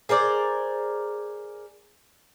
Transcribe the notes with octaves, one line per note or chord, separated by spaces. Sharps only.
G#4 A#4 C5 D5